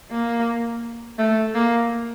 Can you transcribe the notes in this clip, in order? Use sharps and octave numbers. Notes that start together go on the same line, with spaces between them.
A#3
A3
A#3